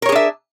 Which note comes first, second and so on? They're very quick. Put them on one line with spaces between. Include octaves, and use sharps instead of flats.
A#4 C#5 G#4 D4 E5